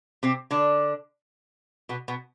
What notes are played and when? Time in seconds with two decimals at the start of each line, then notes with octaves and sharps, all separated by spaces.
0.23 C3 C4
0.51 D3 D4
1.89 B2 B3
2.08 B2 B3